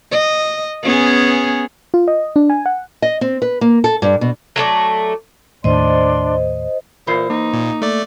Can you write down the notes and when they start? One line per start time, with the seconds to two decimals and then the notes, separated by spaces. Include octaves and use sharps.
0.12 D#5
0.83 B3 C#4 G#4
1.94 F4
2.08 D#5
2.36 D4
2.50 G#5
2.66 F#5
3.02 D#5
3.21 C4
3.42 B4
3.61 A#3
3.84 A4
4.02 G2
4.21 B2
4.56 F#3 A3 B4 D5
5.64 D#2 A2 D4 C5 D5 D#5 C6
7.07 A#2 E3 C5
7.30 A#3 D#4
7.53 A#2
7.82 A3 D5